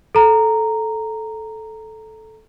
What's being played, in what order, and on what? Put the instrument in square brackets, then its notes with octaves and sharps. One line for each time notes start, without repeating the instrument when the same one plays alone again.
[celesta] A4 A#5